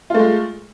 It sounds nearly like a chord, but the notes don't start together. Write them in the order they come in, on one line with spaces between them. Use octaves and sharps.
F4 A3 G#3